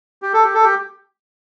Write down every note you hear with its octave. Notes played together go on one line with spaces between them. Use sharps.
G4
A4
G4
A4
G4